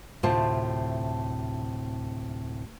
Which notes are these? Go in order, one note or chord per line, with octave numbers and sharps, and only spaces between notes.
D2 A2 C3 F4 C5 A5